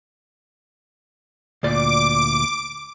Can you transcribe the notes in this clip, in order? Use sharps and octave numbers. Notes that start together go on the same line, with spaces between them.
D2 A#2 D5 D6